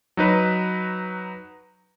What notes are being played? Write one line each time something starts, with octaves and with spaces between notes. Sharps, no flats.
F#3 D#4 B4